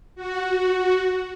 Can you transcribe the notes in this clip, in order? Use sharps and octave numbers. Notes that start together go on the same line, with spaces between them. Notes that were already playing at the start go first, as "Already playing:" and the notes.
F#4